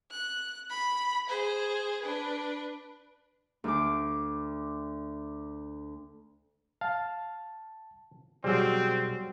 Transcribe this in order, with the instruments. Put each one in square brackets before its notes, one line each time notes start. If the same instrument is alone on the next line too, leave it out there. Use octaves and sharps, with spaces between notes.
[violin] F#6
B5
G#4 C5
D4 B4
[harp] D2 D6
[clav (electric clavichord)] F5 [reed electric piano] A5
[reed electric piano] B2 G#4 C5 [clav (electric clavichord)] F#3 G3 [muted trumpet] C4